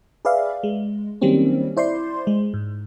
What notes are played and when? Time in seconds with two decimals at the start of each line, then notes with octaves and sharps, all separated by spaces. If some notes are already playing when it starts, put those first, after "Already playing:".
0.25 G#4 B4 D5 E5 F5
0.63 G#3
1.21 D#3 F#3 G3 A#3 C4 C#4
1.77 E4 C5 D5 C6
2.27 G#3
2.54 G#2